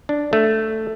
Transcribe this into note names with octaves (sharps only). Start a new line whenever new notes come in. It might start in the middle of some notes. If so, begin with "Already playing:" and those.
D4
A3